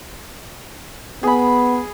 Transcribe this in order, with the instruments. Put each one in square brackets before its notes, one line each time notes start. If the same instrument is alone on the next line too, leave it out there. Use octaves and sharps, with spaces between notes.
[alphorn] B3 [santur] G#4 B5